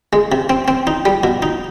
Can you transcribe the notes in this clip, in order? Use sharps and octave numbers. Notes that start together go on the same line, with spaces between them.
G#3
C3
C4
C4
D#4
G3
B2
D#4